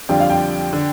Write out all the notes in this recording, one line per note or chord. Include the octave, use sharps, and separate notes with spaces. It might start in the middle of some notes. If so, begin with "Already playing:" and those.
F2 D3 G3 D4 F4 G5
F5
G5
D3